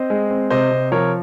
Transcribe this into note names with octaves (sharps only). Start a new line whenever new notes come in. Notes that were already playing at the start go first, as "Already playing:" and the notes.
Already playing: C4 C5 D#5
G#3
C4
C3 C5 D#5
C3
F3 A#4 C#5